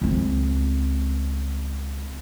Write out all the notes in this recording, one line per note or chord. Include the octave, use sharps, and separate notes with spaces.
C#2 C4